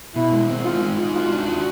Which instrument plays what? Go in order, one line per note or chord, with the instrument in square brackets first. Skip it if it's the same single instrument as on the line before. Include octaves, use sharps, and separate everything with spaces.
[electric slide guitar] B2 [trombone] E4
[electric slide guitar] G#3
C4
[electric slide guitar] D#4 [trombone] F4
[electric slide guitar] G#3
D#4
[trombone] F4 [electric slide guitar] F#4
[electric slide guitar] D4
F#4